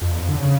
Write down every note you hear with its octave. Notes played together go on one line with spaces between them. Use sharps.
F2
E2
F2
D3
C#3